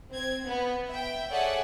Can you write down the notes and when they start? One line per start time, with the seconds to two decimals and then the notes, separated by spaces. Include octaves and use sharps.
0.11 C4 G#6
0.45 B3
0.91 E5 G5
1.31 G#4 A4 C#5 D5 E5 F#5